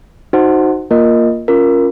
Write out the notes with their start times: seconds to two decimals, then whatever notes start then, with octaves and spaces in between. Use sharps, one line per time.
0.33 D#4 F#4 C5 F#5
0.91 A#3 F4 A#4 D#5
1.48 C#4 F4 A#4